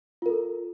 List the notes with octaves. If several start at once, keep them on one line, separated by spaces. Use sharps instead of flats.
F4 A4 A#4